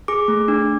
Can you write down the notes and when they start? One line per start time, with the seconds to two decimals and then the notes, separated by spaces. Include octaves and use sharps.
0.08 G#4 D6
0.28 A3
0.48 D4